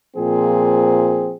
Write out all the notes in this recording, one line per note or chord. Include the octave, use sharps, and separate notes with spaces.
A#2 F3 C4 G#4